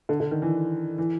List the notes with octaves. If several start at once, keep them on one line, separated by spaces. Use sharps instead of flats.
D3
D3
D#3
E3
E3